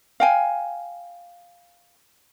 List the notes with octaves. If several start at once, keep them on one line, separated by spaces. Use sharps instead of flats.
F5 G5 G#5